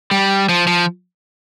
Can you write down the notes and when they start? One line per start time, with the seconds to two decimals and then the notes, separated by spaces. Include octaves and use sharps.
0.11 G3
0.49 F3
0.67 F3